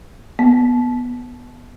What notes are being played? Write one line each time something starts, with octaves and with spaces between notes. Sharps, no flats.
B3